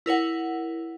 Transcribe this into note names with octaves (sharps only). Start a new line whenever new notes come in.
E4 A#4 C#5 F#5